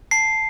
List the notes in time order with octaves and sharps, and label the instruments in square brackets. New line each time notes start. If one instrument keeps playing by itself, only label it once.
[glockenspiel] A5 C7